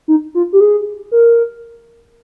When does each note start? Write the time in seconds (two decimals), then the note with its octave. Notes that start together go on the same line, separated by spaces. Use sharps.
0.08 D#4
0.35 F4
0.53 G4
0.61 G#4
1.12 A#4